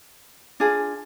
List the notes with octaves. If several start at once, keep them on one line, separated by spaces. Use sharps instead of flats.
D4 F4 G#4